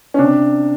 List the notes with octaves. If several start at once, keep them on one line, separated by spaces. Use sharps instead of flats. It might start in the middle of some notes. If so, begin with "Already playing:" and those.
C#4
C3 D4